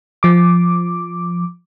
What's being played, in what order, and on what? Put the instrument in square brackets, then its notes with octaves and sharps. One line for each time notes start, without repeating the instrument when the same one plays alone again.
[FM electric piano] F3 D6